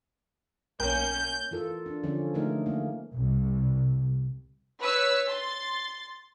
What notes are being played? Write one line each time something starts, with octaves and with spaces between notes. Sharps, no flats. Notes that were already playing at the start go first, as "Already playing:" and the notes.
B1 A#3 C#4 A#4 G5 G6
E3 F4 A4 A#4
D4
D3 F3 C#4
D3 E3 G#3 A3 D#4 A#4
A#3
C2
B4 C#5 E6 B6
C6 A6